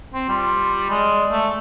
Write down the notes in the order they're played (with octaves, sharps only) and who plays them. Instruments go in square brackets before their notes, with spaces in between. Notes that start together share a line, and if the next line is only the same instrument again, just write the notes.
[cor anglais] C4
[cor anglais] G3 [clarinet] F4
[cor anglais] G#3 [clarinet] D5
[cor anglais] A3